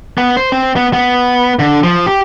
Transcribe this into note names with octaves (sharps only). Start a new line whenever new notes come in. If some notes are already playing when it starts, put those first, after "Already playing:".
B3
C5
C4
B3
B3
D3
F3
G4